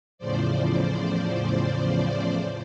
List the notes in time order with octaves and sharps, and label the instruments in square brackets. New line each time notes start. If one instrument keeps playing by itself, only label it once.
[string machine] E2 A2 C#3 F3 C5 D5